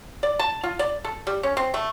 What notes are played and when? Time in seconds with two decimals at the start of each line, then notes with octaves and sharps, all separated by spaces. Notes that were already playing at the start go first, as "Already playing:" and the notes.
0.23 D5
0.39 A5
0.63 F4
0.79 D5
1.04 A4
1.27 G3
1.43 C#4
1.57 C4
1.74 A3